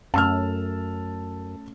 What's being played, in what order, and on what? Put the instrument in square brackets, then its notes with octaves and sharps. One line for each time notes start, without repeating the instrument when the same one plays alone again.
[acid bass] F#2 [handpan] A3 C#4 [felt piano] A5 E6 F6